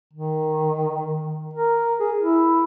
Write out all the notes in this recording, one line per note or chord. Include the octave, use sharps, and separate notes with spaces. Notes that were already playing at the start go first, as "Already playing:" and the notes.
D#3
A#4
G#4
E4